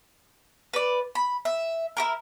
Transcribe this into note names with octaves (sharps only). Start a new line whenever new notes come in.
B4 D5
B5
E5
E4 G4 A#4